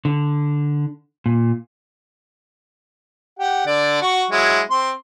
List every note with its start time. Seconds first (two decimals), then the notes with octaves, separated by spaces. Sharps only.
0.05 D3
1.26 A#2
3.39 G4 F#5
3.66 D3 D5
4.02 F#4 C#6
4.31 F#3 G#3 E4
4.70 C4 C6